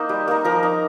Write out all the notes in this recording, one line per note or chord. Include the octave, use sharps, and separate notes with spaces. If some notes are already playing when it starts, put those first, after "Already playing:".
Already playing: A#3 D#4 C5 D#5
G3
A#3 D#4
F3 A#4
D#4